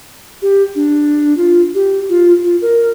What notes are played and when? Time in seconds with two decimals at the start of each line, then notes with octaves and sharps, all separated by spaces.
0.42 G4
0.76 D4
1.37 F4
1.75 G4
2.09 F4
2.43 F4
2.62 A#4